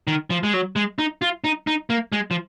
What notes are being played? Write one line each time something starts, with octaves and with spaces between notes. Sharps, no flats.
D#3
F3
G#3
F#3
G#3
D#4
F4
D#4
D#4
A#3
G#3
F3